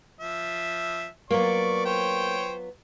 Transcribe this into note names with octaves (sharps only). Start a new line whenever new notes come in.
F3 E5
F#3 A#3 B3 F4 D5 C#6
C5 C#5 G5